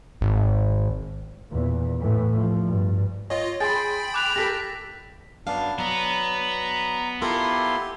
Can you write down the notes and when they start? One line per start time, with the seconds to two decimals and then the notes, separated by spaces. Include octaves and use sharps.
0.21 G#1
1.51 E2 A#2
2.00 A2 E3
2.37 F3
2.66 G2
3.30 F4 C#5 D#5
3.60 G#4 G5 G#5 B5 C6 A6
4.14 D6 F#6 F7
4.36 G4 A4 A#4 A#6 B6
5.47 F#2 B3 D4 F5
5.79 F#3 B3 D4 A#5
7.22 E4 F4 G4 A4 A#4 C6